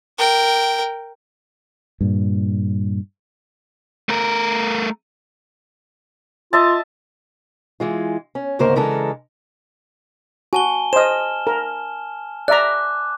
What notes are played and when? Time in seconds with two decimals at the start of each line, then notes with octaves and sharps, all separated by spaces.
0.18 A#4 G5
2.01 G2 A#2
4.09 A3 A#4
6.53 F4 D#5 E5 A5
7.80 E3 G#3 F4
8.35 C#4
8.59 D2 G#2 C#3 A#3 A#4 C5
8.76 C#3 E3 G#3 D4 A4 A#4
10.53 F#4 G#5 A5 G7
10.93 C5 D#5 F6 E7
11.47 A#4
12.48 D5 E5 A#5 D6 F#6